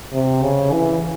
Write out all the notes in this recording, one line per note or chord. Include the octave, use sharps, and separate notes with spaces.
C3
C#3
E3